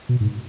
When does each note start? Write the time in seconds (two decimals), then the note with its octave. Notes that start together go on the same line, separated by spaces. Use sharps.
0.09 B2
0.20 G#2